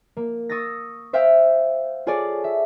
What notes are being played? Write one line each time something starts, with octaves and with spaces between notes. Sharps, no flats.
A#3
C#6 D#6 E6 A6 A#6
C5 E5 F5 G5
F4 G#4 A4 C#5 D5
E5